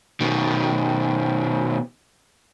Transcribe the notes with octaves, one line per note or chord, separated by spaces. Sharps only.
B2 D#3